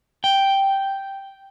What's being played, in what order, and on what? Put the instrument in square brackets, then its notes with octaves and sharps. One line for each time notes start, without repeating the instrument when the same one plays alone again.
[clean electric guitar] G5